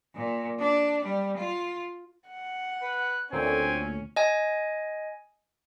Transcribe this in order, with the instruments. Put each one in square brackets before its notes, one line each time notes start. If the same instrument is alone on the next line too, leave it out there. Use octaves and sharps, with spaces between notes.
[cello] A#2
D4
G3
F4
[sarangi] F#5
[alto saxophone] B4 [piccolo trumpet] F#6
[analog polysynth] D2 A#2 [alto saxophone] C4 [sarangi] C#4 [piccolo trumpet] G#5
[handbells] D#5 G#5